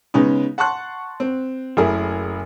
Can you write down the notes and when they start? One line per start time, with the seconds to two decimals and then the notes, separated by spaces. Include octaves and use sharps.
0.14 C#3 G#3 B3 C#4 D#4
0.58 F#5 A5 C6 C#6 F#6
1.20 C4
1.77 F#1 A3 E4 G#4 A#4